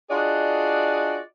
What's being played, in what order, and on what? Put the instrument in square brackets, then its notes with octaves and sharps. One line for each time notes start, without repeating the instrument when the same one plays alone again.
[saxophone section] D4 F4 F#4 G#4 D5 D#5